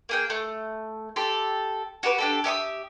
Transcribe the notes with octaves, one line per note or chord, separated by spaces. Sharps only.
A#3 G#4 G5
A3
G4 A4 C6
F#4 G4 B4 D6
D4 G4 A4
G4 E5 D6 D#6